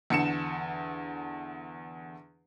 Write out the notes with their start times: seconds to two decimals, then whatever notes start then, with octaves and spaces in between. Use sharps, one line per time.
0.10 E2 D3 C#7 E7